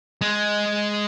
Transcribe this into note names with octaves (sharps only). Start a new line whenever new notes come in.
G#3